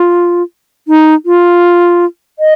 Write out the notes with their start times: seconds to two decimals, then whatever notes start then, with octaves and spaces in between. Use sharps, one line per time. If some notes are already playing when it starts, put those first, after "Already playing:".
Already playing: F4
0.88 D#4
1.26 F4
2.39 D#5